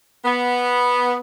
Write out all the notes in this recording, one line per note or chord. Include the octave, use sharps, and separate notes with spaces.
B3